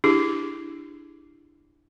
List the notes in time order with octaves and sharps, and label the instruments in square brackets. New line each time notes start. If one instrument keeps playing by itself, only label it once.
[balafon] D4 E4 G4 G#4